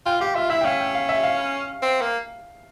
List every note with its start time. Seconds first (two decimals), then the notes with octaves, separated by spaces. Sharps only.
0.06 F4 G5
0.20 G4 F5
0.35 F4 E5
0.50 E4 E5
0.61 G5
0.65 C#4 F5
0.80 G5
0.95 F5
1.09 E5
1.23 F5
1.82 C4
2.01 A#3